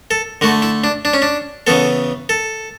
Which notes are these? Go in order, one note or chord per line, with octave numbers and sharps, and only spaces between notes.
A4
D3 A3 F#4
E4
D4
D4
C#4
D4
C#3 E3 B3 A4
A4